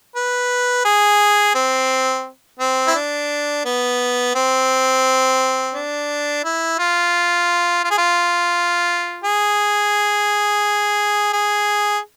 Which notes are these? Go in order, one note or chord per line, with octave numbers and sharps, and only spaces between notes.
B4
G#4
C4
C4
E4
D4
B3
C4
D4
E4
F4
F4
G#4
F4
G#4
G#4